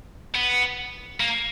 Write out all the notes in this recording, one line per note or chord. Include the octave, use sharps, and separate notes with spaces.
B3
A#3